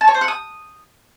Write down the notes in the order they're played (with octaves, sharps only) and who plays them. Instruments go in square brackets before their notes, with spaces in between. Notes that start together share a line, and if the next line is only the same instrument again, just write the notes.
[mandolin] A5
C#5
C5
F#5
D#6